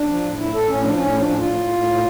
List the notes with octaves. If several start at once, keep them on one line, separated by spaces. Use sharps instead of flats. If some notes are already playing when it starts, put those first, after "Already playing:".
Already playing: D4
F3
A2
A2 E4
A2 A4
A2 C#4
F3 D4
A2 C#4
F3 D4
A2
F4
A2
A2
A2
A2